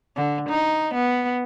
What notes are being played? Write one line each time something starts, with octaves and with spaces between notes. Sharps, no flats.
D3
D#4
B3